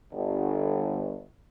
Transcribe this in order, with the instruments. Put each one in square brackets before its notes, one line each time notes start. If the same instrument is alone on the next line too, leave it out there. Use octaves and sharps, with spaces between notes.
[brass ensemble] G1